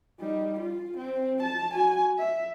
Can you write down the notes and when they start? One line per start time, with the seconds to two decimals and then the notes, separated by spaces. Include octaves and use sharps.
0.20 G3 D#4
0.59 F4
0.97 C4
1.43 A5
1.74 F#4 G#5
2.18 E5